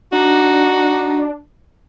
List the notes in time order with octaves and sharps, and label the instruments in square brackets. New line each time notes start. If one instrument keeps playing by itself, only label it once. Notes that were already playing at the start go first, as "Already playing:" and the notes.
[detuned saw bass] D4 [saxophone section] D#4 F#4